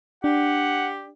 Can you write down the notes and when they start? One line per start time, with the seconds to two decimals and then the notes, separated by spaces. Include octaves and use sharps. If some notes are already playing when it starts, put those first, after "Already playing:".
0.24 D4 G4 F#5